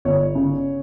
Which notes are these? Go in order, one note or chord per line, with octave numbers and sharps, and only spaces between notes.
G1 C#5
C#3